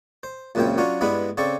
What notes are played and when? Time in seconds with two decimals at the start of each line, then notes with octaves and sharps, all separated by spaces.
0.23 C5
0.55 C#2 F#2 A#2 C#3 C4 G5
0.78 F#3 C#4 D4 F4
1.01 G2 G#3 B3 D4 E4 B5
1.37 C#3 C4 A4 D5 C#6